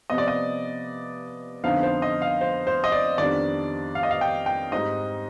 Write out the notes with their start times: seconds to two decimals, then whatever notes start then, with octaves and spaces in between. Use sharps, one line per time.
0.10 C3 F3 B3 D#5
0.18 D5
0.28 D#5
1.63 F2 D3 F3 B3 D#4 F5
1.83 C5
2.02 D#5
2.22 F5
2.41 C5
2.67 C5
2.84 D#5
2.92 D5
3.18 F2 D#3 G3 B3 D4 D5
3.95 F5
4.03 D#5
4.11 F5
4.21 G5
4.46 G5
4.72 G#2 G3 C4 D#4 D#5